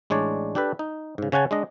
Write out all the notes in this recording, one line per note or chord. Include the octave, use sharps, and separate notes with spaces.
A1 G#3 D4 C#5 D5
D4 G4 A4 B4
D#4
G#2 C#3
C#3 C#4 F#5 G#5 A5
G#3 D4 D#5